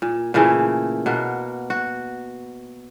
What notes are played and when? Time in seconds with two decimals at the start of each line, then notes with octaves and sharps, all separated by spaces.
0.02 A#2
0.34 A#2 C#3 E3 A3
1.06 B2 A#3 F#4
1.70 F#4